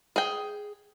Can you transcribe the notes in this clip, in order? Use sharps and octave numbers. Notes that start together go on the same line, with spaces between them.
G#4 G5